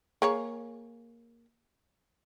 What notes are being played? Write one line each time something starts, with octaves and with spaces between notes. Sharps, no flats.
A#3 G#4 C#5